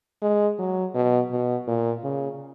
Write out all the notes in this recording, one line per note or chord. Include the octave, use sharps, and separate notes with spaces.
G#3
F#3
B2
B2
A#2
C#3